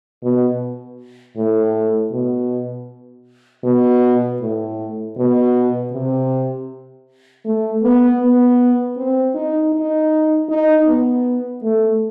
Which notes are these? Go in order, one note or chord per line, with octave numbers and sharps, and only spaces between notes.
B2
A2
B2
B2
A2
B2
C3
A3
B3
B3
C4
D#4
D#4
D#4
B3
A3